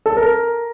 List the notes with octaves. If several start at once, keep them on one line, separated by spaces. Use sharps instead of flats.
A4
A#4